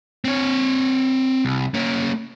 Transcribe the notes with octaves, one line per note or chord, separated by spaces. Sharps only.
C4 C#5
C2
A#3 C#4